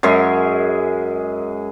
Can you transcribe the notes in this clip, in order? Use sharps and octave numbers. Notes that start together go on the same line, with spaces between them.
F#2 G#3 G#4 E5